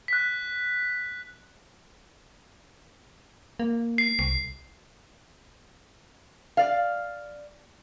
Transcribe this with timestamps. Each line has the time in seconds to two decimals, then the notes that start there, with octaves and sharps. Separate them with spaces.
0.08 F#6 B6
3.60 A#3
3.98 C7
4.19 C2 C7
6.57 D5 F5